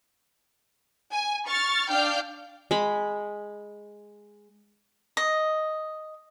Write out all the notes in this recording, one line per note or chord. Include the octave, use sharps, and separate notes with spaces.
G#5
C#6 F6 A6
D4 F5 G5 F6 G6
G#3 B5
D#5